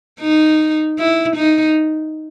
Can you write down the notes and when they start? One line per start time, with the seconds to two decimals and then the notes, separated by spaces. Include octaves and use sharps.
0.20 D#4
0.99 E4
1.37 D#4